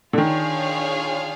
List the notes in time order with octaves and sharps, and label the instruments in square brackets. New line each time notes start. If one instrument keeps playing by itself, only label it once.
[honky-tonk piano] D3
[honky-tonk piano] D#3 [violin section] D4 F4 G#4 C#5 F5